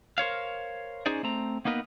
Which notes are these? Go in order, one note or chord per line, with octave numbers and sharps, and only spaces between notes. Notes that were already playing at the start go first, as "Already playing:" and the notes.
A#4 C5 C#5 F5
C#4 D#4 G#4 C5 D5
A3 C4 A#5
A#3 B3 D#4 A#4 B4